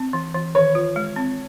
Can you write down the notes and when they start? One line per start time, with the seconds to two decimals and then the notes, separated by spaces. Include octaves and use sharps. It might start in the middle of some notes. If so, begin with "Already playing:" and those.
Already playing: C4
0.13 E3
0.35 E3
0.55 D#3 C#5
0.75 F4
0.96 G#3
1.16 C4